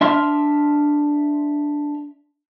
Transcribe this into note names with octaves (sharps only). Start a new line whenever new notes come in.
D4 E5 C6 F6